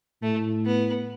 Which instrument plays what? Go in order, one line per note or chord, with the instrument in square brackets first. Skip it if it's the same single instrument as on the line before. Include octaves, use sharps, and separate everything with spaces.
[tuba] A2 [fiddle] A3
[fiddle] B3